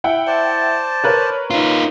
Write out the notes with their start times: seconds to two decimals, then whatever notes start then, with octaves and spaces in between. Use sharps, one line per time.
0.04 E4 F#5 G5
0.27 C5 D5 A5
1.04 A#4 B4 C#5
1.50 D#4 F4